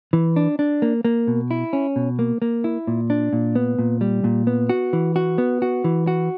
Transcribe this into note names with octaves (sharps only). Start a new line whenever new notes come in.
E3
D4
D4
A#3
A#3
B2
E4
C#4
B2
A#3
A#3
E4
A#2
D4
A#2
B3
A#2
G3
A#2
B3
F#4
E3
F#4
B3
F#4
E3
F#4